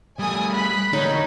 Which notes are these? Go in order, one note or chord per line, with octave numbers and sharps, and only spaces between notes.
G3 A3 G#5 D#6
B5 F#6 B6
D3 A#3 D#4 C#5